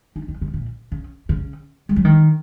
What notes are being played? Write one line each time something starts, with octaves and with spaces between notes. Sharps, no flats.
D#4
D#3
C#3
A#2
C#3
C#3
G#3
F#3
D#3